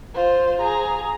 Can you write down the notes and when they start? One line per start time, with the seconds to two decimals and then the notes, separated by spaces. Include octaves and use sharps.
0.14 F4 C5
0.60 G#4 A#5